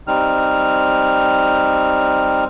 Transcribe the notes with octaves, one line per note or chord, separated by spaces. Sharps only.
G3 C4 D#4 F6